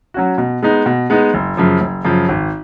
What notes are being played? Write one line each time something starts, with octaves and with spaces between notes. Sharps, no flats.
F#3 C#4 F#4
B2
G#3 B3 D#4
B2
G#3 B3 D#4
F#1
F#2 C#3 F3
F#1
F#2 C#3 F3
G#1